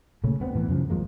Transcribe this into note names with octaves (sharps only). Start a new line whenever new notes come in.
A#2 C#3 A3 C#4
D2 B3 C4
A2 E3 B3
F#2 C#3 F3
G#1 F3 G#3 A#3